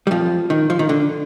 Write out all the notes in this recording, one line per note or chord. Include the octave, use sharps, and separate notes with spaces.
G3
F2 F3
D#3
F3
D#3
D3